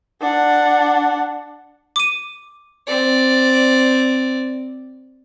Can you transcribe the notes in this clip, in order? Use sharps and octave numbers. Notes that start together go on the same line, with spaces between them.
D4 F#5
D6 D#7
C4 D5